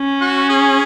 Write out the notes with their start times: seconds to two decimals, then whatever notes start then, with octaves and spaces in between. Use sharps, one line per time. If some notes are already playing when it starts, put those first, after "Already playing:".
Already playing: C#4
0.21 F#4
0.49 G#4